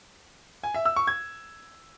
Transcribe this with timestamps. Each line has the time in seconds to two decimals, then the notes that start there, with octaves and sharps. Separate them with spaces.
0.63 G#5
0.74 E5
0.85 E6
0.96 C#6
1.07 G#6